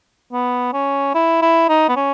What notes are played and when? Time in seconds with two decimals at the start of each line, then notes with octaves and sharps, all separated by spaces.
0.33 B3
0.73 C#4
1.14 E4
1.42 E4
1.69 D#4
1.89 B3
1.96 C#4